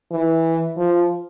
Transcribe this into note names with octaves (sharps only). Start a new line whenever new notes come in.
E3
F3